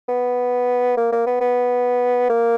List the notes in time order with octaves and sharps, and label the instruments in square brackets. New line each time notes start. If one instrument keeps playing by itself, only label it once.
[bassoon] B3
A#3
A#3
B3
B3
A#3